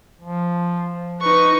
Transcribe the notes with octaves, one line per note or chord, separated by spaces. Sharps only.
F3
D#4 B4 C#6